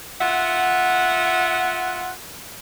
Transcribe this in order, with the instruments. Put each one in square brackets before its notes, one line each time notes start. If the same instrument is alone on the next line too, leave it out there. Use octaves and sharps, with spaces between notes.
[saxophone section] F4 E5 F#5